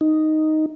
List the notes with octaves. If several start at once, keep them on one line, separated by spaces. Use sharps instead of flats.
D#4